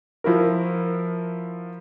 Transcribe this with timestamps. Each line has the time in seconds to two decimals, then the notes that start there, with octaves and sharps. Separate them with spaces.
0.24 F3 E4 F#4 A#4